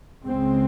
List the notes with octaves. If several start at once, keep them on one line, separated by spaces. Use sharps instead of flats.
C#2 C#3 G#3 C4